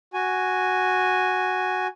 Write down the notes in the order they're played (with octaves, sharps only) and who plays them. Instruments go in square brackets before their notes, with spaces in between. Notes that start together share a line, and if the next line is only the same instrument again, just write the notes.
[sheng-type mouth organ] F#4 G#5